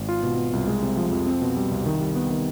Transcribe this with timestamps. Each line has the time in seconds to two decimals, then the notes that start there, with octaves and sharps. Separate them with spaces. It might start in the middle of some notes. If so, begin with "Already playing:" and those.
Already playing: G#1
0.09 F4
0.23 B2
0.38 B3
0.53 C2
0.67 G#3
0.83 C3
0.97 F3
1.12 F2
1.27 C4
1.42 B2
1.57 G3
1.71 C2
1.86 D#3
2.01 G3
2.15 B3
2.30 D#3